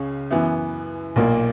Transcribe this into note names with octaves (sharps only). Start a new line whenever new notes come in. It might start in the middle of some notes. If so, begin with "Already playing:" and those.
Already playing: C#2 C#3 C#4
F#2 E3 B3 E4
B1 A#2 A#3